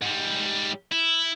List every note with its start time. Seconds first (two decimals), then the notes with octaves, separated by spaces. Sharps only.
0.02 G#2 G3
0.92 E4